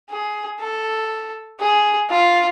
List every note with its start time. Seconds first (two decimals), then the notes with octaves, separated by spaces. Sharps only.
0.11 G#4
0.60 A4
1.61 G#4
2.10 F4